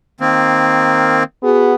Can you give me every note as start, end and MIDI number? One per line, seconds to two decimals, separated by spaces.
0.20 1.23 51
0.20 1.23 58
0.20 1.23 60
1.43 1.75 59
1.43 1.75 66
1.43 1.75 68